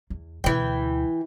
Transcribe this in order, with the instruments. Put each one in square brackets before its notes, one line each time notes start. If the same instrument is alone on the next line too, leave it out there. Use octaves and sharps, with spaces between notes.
[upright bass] E2
[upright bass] D2 B2 [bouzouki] E3 G5